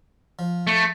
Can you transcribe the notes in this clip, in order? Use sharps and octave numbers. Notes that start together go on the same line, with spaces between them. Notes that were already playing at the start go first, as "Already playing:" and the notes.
F3
A3